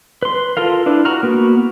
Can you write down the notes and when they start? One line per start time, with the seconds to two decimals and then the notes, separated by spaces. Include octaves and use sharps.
0.23 B4 C6
0.57 F4 A4 A#4 F5
0.86 D4 E4 B4
1.05 F#4 A#5 F6
1.23 A#3 B3 F#4